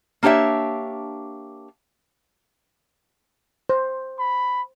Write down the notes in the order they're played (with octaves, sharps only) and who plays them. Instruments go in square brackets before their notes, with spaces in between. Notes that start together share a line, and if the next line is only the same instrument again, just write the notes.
[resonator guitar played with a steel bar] A#3 D4 G4 C#5 E5
[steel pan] C5
[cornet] B5